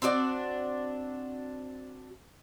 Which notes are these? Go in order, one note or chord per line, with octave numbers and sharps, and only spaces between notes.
C4 D4 F#4 D5